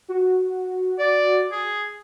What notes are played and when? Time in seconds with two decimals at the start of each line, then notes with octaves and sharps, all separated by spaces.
0.08 F#4
0.99 D5
1.52 G#4